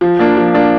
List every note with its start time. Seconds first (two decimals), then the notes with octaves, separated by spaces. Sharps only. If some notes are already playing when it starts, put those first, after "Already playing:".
0.01 F3
0.19 A#3 D4
0.37 F3
0.54 A#3 D4